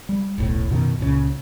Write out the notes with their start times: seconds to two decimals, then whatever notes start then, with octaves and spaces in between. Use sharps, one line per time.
0.09 G3
0.38 D#1 B1 A2
0.70 F#2 B2 D#3
1.00 C#2 A#2 C#3